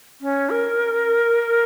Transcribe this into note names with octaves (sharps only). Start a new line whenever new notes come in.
C#4
A#4